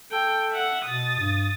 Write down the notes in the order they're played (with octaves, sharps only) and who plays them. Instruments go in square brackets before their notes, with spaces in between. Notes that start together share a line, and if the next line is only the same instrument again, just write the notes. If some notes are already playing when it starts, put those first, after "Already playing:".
[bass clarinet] A4 [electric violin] G5
[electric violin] E5 F#5
[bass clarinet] B2 [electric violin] D#6 A6
[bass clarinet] G2